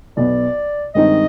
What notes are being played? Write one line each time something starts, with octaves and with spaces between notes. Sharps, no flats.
B1 B2 B3 D5
G2 D#3 G#3 C4 D#4 D#5